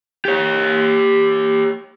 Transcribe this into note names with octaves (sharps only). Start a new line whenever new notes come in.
G4 C#5